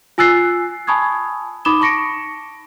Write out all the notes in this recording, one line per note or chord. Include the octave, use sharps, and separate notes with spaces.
F4 G#5 E6 F#6 A6 C7
G#5 A5 B5 C#6 D#6 G#6
D#4 B5 D6 D#6 E7 G7
A5 C#6 A#6 C#7 D7